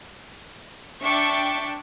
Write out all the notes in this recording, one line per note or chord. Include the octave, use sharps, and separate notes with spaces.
D4 E5 G5 A5 C#6 D6